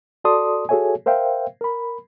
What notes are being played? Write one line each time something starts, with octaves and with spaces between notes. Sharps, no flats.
F#4 A4 D5 A5 C6 D#6
F#4 G#4 A4 C#5 E5 G#5
A#4 C5 E5 F5 G5
A#4 B5